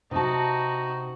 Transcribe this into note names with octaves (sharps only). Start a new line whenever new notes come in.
C3 D#4 F#4 A5